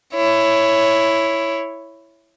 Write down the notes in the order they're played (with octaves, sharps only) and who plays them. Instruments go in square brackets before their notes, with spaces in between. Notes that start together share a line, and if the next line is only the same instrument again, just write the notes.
[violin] E4 C#5